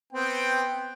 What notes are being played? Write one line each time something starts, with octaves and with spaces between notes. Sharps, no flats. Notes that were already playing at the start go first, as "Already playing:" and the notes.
B3 C4 G5